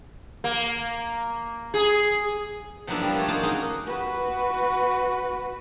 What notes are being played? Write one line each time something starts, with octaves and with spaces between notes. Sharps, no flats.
A#3
G#4
F3 F#3 A#3 B3 D4 E4
F3 G3 A#3
A3 C#5 D5 A5 C6
A#3 F4 F#4 C5 D#5 A5
A#3 C#4 D#4 F#4 G#4
F#4 B4